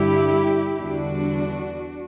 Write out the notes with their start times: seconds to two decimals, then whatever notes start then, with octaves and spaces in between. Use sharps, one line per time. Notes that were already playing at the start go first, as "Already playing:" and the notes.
Already playing: G2 D3 G3 E4 G4
0.82 E2 D3 G3 D4 F#4